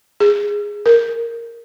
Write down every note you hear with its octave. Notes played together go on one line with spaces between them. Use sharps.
G#4
A#4